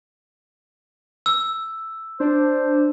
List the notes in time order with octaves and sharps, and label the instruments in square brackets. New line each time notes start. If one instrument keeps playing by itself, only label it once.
[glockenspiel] E6
[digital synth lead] D4 [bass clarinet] C5